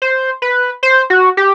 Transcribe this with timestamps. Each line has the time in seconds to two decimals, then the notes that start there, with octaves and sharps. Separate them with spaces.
0.02 C5
0.42 B4
0.83 C5
1.10 F#4
1.37 G4